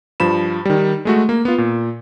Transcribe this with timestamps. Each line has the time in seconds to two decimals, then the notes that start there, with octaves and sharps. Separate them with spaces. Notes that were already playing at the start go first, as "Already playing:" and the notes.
0.20 G2 F3 B5 E7
0.65 D#3 G3
1.05 G#3 A3 F#4
1.29 A#3
1.45 B3 F4
1.58 A#2